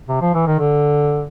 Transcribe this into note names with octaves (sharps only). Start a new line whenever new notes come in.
C3
F3
E3
D#3
D3